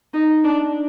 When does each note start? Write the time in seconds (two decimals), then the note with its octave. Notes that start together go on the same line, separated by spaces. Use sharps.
0.14 D#4
0.44 D4